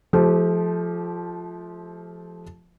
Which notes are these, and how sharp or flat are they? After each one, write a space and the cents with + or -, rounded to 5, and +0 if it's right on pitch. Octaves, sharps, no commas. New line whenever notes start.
F3 +0 A3 -35 G4 -10